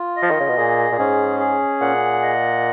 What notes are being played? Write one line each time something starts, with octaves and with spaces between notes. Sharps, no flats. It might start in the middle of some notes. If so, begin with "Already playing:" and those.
Already playing: F4
D#5
F3
D#3
C#3
B2
A#2 G#4
A#2
G#2 C#4
G#4
A#2 F#5
D#5